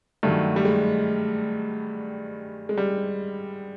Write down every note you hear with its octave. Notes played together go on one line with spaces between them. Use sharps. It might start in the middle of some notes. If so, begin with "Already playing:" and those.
G2 D#3 F#3 A3
G3
G#3
G#3
G3